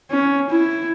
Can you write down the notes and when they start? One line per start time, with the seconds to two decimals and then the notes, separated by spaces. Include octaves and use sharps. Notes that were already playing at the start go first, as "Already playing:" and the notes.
0.11 C#4
0.50 E4